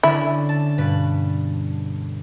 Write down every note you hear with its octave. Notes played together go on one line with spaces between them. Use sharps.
D3 C#4 D4 E4
A5
G2 B2 B4